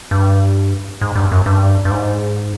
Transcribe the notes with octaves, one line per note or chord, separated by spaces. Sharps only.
G2
G#2
G2
F#2
G2
G2
G#2